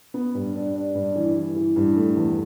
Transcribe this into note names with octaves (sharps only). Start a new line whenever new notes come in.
B3
G2
D4
D4
G2
E3
E3
E3
G2
A3
E2